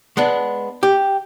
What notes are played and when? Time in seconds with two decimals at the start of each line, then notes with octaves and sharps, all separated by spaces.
0.17 G#3 B3 D4
0.83 G4